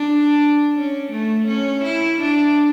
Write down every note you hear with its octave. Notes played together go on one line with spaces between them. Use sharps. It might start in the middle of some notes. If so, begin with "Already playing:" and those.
Already playing: D4
C#4
A3
C#4
E4
D4